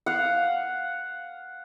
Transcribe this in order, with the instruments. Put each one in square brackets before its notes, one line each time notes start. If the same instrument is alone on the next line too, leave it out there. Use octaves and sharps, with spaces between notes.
[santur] F5 F#5